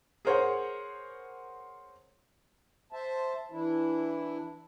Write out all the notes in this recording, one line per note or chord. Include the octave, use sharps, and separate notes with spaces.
G#4 A#4 C5 C#5 F#5
C5 E5 A5
E3 D4 E4